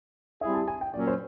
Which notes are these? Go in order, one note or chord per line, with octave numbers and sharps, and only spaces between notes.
G3 C4 E4 G#4 E5
A5
G#5
G5
A#2 F#3 A#3 C#4 D5
C5